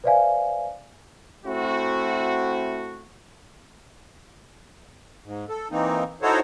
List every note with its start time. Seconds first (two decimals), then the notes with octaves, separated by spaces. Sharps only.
0.04 B4 C5 D5 E5 F5 G#5
1.46 A3 C4 E4 F#4
5.24 G#2
5.49 A4
5.71 E3 A#3 C4 D#4
6.22 D#4 E4 F#4 A4 C5 C#5